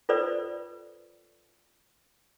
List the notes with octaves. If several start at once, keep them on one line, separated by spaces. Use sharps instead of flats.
F4 A4 B4 C5 D5